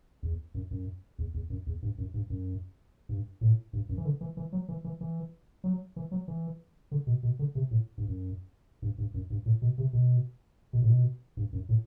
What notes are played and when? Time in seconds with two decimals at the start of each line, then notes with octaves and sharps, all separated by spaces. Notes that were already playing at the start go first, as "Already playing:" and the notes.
0.23 E2
0.54 F#2
0.71 F#2
1.19 E2
1.34 E2
1.50 F#2
1.66 E2
1.82 G2
1.98 F#2
2.14 G2
2.30 F#2
3.09 G2
3.41 A2
3.73 G2
3.89 F#2
3.98 E3
4.05 D3
4.21 E3
4.37 E3
4.53 F#3
4.69 E3
4.84 E3
5.01 E3
5.64 F#3
5.96 E3
6.12 F#3
6.28 E3
6.91 D3
7.07 B2
7.23 B2
7.39 D3
7.55 C3
7.71 A2
7.98 G2
8.08 F#2
8.82 G2
8.98 G2
9.14 F#2
9.30 G2
9.46 A2
9.62 B2
9.78 C3
9.93 B2
10.73 B2
10.82 A2
10.89 B2
11.37 G2
11.53 F#2
11.69 A2